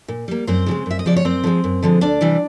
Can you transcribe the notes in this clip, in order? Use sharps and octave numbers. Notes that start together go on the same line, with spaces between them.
A#2
G3 A#3
F#2 C4 C5
C#3 F3 G#3
F#2 E5
D#5
C#3 F3 G#3 D5
C#5
F#2 C4 C5
D3 F3 G#3
F#2
D3 F3 G#3
D2 D4 D5
C3 E3 G3